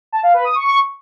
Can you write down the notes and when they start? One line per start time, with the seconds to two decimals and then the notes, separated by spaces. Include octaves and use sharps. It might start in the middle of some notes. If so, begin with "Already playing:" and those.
0.12 A5
0.23 F5
0.34 B4
0.45 D#6
0.55 C#6